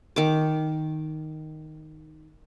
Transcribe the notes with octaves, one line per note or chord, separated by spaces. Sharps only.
D#3 D6